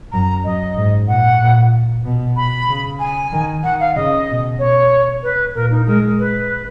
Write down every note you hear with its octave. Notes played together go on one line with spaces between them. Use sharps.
F#2 A#5
F#2 D#5
G#2
A#2 F#5
A#2
B2
B5
C#3
G#5
D#3
D#3 F#5
F5
C#3 D#5
B2
C#5
B4
A#2 A#4
D#4
G#3 A#4
B4